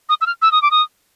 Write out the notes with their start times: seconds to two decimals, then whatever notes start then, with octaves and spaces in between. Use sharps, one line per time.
0.09 D#6
0.21 E6
0.26 F6
0.42 E6
0.52 D#6
0.62 D6
0.71 D#6